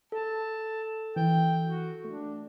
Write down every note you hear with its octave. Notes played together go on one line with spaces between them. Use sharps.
A4 A5
E3 G5
F#4
A3 D4